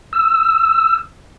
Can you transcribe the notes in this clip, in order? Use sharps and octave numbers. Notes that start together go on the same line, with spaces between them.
E6